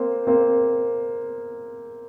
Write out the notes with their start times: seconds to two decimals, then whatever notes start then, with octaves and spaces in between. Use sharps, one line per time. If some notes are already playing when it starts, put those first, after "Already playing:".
Already playing: A#3 C4
0.27 A#3 C4